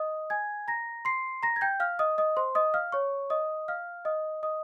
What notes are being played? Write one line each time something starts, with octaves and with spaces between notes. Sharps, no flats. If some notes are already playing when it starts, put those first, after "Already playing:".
Already playing: D#5 D#6
G#5 G#6
A#5 A#6
C6 C7
A#5 A#6
G#6
G5 G6
F5 F6
D#5 D#6
D#5 D#6
C5 C6
D#5 D#6
F5 F6
C#5 C#6
D#5 D#6
F5 F6
D#5 D#6
D#5 D#6